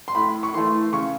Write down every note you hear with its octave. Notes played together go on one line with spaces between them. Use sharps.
C6
A2 B5
C#6
E3 A3 C6
C#3 C#6